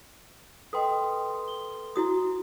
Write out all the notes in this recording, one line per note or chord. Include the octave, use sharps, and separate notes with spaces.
A4 B4 D#5 G5 C6 D#6
G7
E4 F#4 D#6